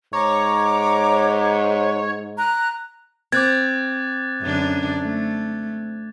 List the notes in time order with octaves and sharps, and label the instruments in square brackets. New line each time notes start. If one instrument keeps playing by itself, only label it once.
[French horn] G#2 [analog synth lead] C#5 [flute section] A#5 D6
[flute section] A#5 F#6
[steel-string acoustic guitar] C4 [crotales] D6 F#6 A6 [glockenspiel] G#6
[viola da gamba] F#2 D3 D4
A3